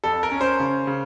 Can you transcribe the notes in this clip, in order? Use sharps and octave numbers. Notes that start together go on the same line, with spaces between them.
F2 A4
A#4
C#4
C5
C#3
C#3